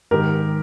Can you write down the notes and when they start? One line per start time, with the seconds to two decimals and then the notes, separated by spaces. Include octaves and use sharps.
0.11 G#2 D#3 G4 A#4